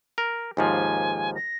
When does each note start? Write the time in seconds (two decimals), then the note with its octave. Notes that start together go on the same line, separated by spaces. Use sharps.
0.18 A#4
0.57 D#2 G#2 F3 G#5
1.35 A#6